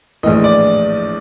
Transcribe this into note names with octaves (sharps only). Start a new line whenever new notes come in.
A#1 A2 E3 D#5
D5